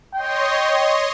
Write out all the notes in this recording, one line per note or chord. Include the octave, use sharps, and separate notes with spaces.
C#5 D#5 G5 C6